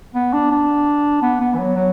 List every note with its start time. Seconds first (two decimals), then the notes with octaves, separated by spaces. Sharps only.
0.15 B3
0.34 D4
0.51 D4
1.22 B3
1.40 B3
1.55 E3
1.59 F#3
1.77 F#3